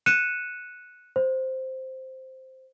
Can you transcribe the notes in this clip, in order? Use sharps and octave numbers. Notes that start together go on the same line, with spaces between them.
F#6 C#7 D#7 E7
C5